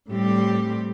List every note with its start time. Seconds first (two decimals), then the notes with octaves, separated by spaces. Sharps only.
0.09 A2 G3 C4 G4